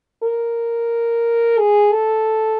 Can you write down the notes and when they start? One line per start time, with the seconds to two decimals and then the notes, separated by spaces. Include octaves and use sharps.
0.23 A#4
1.58 G#4
1.92 A4